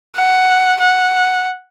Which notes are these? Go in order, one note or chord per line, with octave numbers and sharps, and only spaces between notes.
F#5
F#5